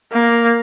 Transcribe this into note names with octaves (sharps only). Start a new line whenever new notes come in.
A#3